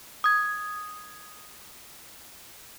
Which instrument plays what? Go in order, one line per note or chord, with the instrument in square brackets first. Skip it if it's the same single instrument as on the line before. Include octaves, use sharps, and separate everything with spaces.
[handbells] D#6 G#6